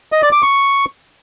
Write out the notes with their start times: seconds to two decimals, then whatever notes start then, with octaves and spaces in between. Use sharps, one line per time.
0.12 D#5
0.22 D5
0.32 D6
0.43 C#6